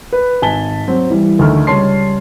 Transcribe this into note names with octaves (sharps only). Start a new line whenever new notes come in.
B4
G#1 G#5 A5 B6 G7
F#3 C4
E3 G3
D2 D#3 A3 F6
C#2 G3 C#5 A5 C6 C7